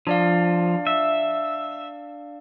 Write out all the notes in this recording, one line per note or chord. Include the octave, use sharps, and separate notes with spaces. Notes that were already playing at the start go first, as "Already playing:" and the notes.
F3 D4 D5 F5
E5